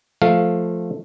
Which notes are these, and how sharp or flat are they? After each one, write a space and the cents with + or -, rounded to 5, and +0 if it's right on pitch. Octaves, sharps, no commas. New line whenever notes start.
F3 +0 A3 +0 F5 +0